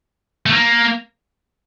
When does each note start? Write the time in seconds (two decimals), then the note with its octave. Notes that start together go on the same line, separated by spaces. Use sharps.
0.46 A3
0.53 A#3